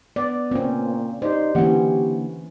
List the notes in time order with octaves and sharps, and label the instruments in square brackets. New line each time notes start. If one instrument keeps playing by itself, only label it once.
[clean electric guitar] B3 [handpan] D5
[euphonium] A#2 [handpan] C4 C#4
[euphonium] D#4 [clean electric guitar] G4 D5 [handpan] C5
[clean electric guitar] D3 A#3 F#5 [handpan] E3 C#4 [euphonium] G4